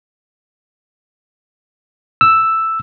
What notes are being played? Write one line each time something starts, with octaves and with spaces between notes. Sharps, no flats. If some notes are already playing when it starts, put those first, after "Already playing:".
E6